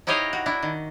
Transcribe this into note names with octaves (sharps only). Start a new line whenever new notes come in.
D#4 E4 G4 C#5 D#5 F5
F#4
D4 E4
D#3